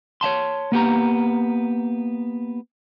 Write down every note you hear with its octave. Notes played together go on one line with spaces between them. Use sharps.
C#5 E5 A5 C6
A#3 B3 G4 A#5